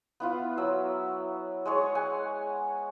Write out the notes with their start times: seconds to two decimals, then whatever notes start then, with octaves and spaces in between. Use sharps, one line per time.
0.20 B3 E4 F4
0.57 F#3 E6
1.65 G#3 G#4 C#5 C#6
1.95 F#5 G#5